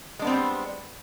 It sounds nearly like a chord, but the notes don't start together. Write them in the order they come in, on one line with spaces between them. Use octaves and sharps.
G#3 D4 B3 C4 G3